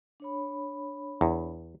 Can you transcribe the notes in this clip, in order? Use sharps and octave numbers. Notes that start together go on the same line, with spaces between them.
D4 C#5 B5
E2